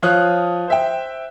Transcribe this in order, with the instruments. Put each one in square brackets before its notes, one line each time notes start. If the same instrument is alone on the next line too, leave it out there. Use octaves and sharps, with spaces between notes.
[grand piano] F3 C#5 F5 D#6 F#6
C5 E5 G5